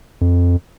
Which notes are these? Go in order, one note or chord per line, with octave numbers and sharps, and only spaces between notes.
F2